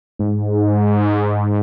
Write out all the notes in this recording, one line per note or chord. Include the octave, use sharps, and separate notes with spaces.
G#2